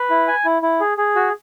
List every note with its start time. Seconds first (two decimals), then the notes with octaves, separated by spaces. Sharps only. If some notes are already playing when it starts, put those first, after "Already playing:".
Already playing: B4
0.10 E4
0.28 G#5
0.45 E4
0.62 E4
0.80 G#4
0.98 G#4
1.16 F#4